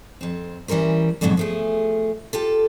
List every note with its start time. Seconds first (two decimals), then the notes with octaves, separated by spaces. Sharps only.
0.21 F2 C4
0.68 E3 G3 C#4 A#4 C5
1.21 F2 G#2 B2 D3 D#3 F#3
1.37 F3 A3 G#4
2.33 F4 G4 A4